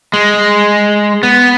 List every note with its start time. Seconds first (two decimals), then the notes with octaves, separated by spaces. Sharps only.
0.13 G#3
1.23 B3